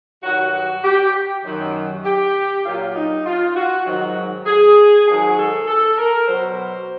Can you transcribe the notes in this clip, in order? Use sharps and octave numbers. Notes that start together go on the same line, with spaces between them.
G2 D#3 F#3 F#4
F#4
G4
F#2 D#3 F#3
G4
A#2 F#3 F4
D#4
F4
F#4
G#2 D#3 F#3
G#4
G#2 D#3 F#3 G#4
A4
A4
A#4
B2 F#3 C5